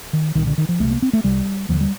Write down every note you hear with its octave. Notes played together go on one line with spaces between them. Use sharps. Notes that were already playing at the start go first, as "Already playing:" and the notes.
D#3
C2 A#2 D#3
D3
D#3
F3
C2 C3 A3
A#3
C4
A3
C2 C3 G3
D#2 D3 F3
G3